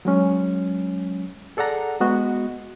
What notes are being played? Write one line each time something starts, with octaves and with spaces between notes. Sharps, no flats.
F#3 G#3 C#4
G#4 A4 D5 F#5 A#5
G#3 B3 F#4 D#5